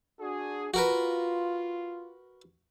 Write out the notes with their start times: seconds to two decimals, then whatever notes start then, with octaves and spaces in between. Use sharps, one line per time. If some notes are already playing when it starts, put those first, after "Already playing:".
0.20 D4 F#4 G#4
0.74 F4 F#4 A#4 B4